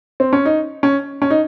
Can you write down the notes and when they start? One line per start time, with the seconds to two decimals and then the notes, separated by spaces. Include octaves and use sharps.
0.20 C4
0.33 C#4
0.45 D#4
0.83 C#4
1.22 C#4
1.30 D#4